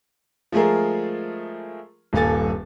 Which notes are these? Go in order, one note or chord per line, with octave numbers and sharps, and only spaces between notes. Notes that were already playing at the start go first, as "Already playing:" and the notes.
F3 G#3 A3 G#4 A#4
D#1 G2 A#3 A4 G#5 A6